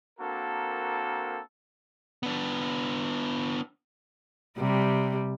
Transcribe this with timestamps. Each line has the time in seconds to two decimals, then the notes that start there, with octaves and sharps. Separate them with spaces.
0.20 A#3 C4 D4 F#4 A4 A#4
2.23 B3 D4
4.57 C3 G3